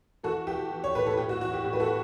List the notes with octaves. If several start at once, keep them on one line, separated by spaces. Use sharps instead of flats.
E3 F#4 A4
E3 G4
E3
C#5
A2 B4
A4
A2 G4
F#4
E3 F#4
G4
A2 G4
B4
F#4 A4